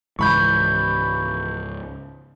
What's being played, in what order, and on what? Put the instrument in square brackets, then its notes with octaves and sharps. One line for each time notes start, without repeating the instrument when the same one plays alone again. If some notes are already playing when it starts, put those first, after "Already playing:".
[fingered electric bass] C#2 G#2 [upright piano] E3 B5 [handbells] C#6 G6